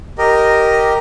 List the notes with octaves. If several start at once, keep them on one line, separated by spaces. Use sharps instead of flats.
G4 A#4 D#5